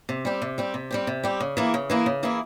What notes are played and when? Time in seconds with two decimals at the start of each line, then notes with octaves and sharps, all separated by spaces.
0.09 C3
0.25 G3 C4 G4
0.42 C3
0.58 G3 C4 G4
0.74 C3
0.91 G3 C4 G4
1.07 C3
1.24 G3 C4 G4
1.40 C#3
1.57 E3 A#3 E4 G#4
1.74 C#3
1.90 E3 A#3 E4 G#4
2.06 C#3
2.23 E3 A#3 E4 G#4